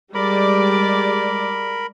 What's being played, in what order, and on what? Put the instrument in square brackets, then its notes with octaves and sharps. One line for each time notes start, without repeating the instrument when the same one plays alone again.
[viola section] G3 G#3 D5 [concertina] A#4 B5